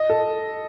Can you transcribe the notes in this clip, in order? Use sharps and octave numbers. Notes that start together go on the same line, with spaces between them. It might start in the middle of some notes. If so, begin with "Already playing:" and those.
Already playing: D#5
A4